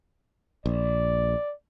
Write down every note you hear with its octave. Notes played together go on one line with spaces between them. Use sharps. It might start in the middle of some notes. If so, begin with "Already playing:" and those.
A#1 D5